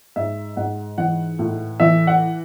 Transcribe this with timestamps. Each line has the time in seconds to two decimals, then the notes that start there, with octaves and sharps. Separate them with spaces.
0.16 G#2 E5
0.57 G#2 F#5
0.98 E3 F#5
1.39 A2
1.80 E3 E5
2.07 F#5